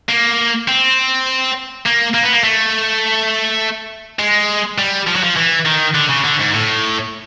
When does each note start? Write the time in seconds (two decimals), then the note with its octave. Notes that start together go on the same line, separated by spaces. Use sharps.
0.09 A#3
0.68 C4
1.86 A#3
2.14 A#3
2.23 B3
2.32 A#3
2.44 A3
4.19 G#3
4.78 G3
5.08 F3
5.16 F#3
5.24 F3
5.37 E3
5.66 D#3
5.95 D3
6.10 C#3
6.25 D3
6.40 G#2
6.54 A2